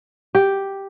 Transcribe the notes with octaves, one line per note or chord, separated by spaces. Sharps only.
G4